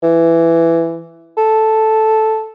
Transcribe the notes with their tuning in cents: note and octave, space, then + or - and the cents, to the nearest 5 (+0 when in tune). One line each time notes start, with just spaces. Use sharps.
E3 +10
A4 -5